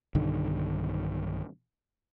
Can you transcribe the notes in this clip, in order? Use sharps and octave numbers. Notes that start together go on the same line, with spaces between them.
B1 G2 D3 D#3